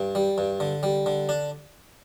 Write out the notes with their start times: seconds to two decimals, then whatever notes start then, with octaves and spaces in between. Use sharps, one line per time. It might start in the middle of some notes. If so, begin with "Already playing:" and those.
Already playing: G2
0.15 G3
0.38 G2
0.60 D3
0.83 G3
1.06 D3
1.29 D4